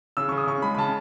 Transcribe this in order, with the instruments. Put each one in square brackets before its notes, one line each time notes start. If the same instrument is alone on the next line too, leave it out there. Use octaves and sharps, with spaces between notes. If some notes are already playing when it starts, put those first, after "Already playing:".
[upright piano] C#3 E6
C#3 C#6
D#6
C#3 C#6
G#3 B5
B5
C#3 A5